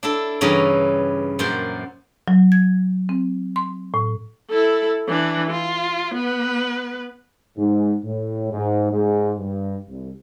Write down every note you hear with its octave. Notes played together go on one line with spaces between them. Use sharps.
D4 E4 A4
G2 C#3 E3 E4 A#5
F#2 A#2 C5 C6
F#3
G#6
C4
C6
A2
E4 A4
E3 D4
F4
B3 B4
G#2
A2
G#2
G#2
G2
C2